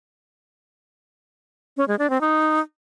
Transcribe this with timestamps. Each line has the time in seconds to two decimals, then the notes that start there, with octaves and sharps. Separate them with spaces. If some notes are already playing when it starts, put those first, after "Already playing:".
1.77 C#4
1.88 G#3
1.99 D4
2.10 C4
2.21 D#4